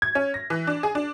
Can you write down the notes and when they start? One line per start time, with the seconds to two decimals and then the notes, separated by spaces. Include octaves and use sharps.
0.02 G#6
0.15 C#4
0.34 A#6
0.50 E3
0.67 D4
0.83 G#4
0.95 D4